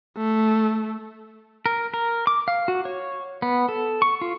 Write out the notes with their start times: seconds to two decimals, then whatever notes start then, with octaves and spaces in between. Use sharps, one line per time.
0.18 A3
1.66 A#4
1.94 A#4
2.27 D6
2.48 F5
2.68 F#4
2.85 C#5
3.42 B3
3.69 A4
4.02 C#6
4.21 F4